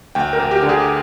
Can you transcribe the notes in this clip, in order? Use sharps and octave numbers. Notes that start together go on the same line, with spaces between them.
D2 G5
A#4
D2
G4
D3
G#4